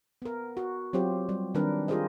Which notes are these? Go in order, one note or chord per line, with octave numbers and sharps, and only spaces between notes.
B3 A#4
F#4
F#3 C4 F4 G4 C5
G3
D#3 G3 C4 D4 A#4 B4
F4 G4 G#4 A#4 C5 D#5